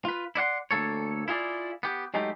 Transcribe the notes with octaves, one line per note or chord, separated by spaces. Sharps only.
F4 B4
E4 D5 F#5 C6
D2 A#2 A#3 A4 C#5
E4 F4 G#4 A#4 D5
B3 G4
F#3 G#3 A3 D#4 G4